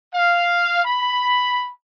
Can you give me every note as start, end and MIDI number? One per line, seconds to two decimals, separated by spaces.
0.15 0.84 77
0.85 1.72 83